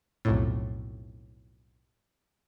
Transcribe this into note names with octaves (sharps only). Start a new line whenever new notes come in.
B1 F2 A2